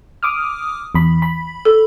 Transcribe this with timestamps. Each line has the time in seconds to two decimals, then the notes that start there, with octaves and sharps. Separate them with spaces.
0.23 D6 D#6 F6
0.95 E2 B5
1.22 B5
1.65 A4